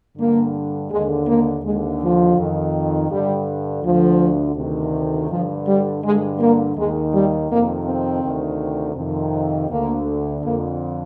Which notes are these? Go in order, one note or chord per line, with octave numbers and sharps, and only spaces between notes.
G2 D3 A#3
D#2 D3 G#3
A#3
D#2 D3 G#3
F3
F2 D#3
G2 D3 G3
D2 D3 F3
D2 C3 D#3
G2 D3 F3
G3
G2 D3 G#3
A#3
D#2 D#3 G#3
G3
F2 C3 D#3 A#3
C4
D2 C3 D#3
F2 C3 D#3
D2 D3 A#3
F2 D3 A#3